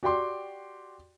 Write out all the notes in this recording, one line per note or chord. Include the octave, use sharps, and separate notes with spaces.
F#4 G4 D5 G5 C6 D6